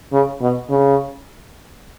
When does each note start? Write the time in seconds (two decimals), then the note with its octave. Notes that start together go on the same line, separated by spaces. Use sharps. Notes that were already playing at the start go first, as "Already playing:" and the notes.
0.13 C#3
0.42 B2
0.70 C#3